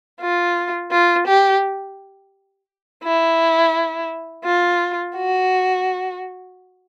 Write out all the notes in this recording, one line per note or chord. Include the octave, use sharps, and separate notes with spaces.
F4
F4
G4
E4
F4
F#4